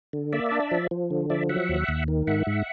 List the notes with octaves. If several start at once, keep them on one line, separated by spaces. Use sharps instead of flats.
D3
A#3 D5 E5
D4
F3
F3
D3
F3 D5 E5
F#3 E5 F#5
D#2
D#2
D#3
G#2 E5 F#5
G#2